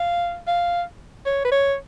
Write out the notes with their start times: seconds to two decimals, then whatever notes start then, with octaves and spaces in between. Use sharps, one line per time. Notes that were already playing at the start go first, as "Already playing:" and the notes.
Already playing: F5
0.47 F5
1.26 C#5
1.45 B4
1.52 C#5